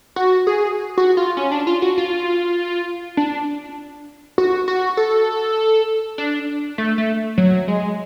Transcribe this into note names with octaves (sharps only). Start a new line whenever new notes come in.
F#4
G#4
F#4
F4
C#4
D4
F4
F#4
F4
D4
F#4
F#4
A4
D4
A3
A3
F#3
G#3